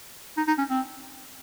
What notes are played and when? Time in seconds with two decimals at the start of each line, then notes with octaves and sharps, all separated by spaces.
0.37 D#4
0.48 D#4
0.58 C#4
0.70 C4